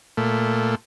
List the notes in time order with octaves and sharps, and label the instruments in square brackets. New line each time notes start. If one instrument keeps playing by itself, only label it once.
[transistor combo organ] A#2 A3